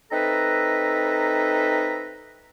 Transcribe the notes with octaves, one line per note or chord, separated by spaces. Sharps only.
C4 D#4 A4 B4 E5 A#5